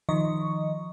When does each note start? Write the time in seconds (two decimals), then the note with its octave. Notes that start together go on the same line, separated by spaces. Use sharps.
0.09 D#3 F3 D#5 C#6